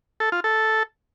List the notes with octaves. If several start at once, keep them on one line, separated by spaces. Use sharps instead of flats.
A4
F4
A4